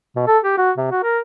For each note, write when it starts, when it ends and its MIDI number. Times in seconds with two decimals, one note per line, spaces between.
0.16 0.23 47
0.27 0.38 69
0.44 0.55 67
0.58 0.71 66
0.78 0.88 48
0.91 1.01 66
1.03 1.19 70